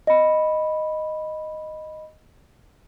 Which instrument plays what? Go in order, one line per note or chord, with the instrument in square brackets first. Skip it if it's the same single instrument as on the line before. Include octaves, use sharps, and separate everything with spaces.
[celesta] D#5 B5